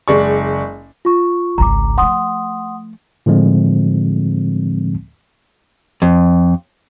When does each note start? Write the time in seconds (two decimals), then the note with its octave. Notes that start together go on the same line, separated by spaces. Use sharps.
0.08 F#1 G#3 D5 C#6
1.05 F4 C#6
1.58 G#1 C#2 A#5 D6
1.98 F3 A3 F#5 C6 D#6
3.26 A2 D3 F3 G#3 C4
6.02 F2